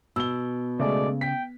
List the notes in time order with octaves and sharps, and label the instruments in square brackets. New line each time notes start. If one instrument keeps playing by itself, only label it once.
[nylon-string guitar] B2 [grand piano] E6 G7
[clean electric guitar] C#3 [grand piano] G#3 A3 [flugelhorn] D5
[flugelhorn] G5 [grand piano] B6